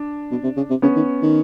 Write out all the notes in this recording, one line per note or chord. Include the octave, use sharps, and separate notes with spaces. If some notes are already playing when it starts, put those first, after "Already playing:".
Already playing: D4
B2
C3
C#3
C3
C#3 B3 C#4
D#3
D#3